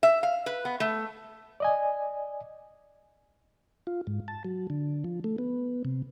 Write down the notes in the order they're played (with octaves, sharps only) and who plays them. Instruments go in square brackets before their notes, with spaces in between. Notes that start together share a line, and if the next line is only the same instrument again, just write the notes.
[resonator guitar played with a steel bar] E5
F5
B4
B3
A3
[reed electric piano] D5 D#5 G#5
[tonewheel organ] F4
G#2
A5
F#3
D3
F3
A3
B3
C3